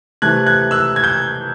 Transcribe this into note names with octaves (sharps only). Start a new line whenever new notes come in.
C3 E3 A3 F#6 G#6
F#6 G#6
E6 F#6
G#6
G6